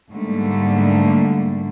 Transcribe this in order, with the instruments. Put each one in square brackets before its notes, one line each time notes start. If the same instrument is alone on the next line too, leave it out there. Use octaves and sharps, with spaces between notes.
[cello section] G#2 D3 G3 A3 A#3